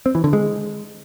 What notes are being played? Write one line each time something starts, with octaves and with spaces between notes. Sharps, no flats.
C4
E3
D3
G#3